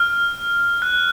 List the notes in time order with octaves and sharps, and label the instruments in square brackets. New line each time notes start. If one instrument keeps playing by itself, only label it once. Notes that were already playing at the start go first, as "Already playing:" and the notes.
Already playing: [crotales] F6
F#6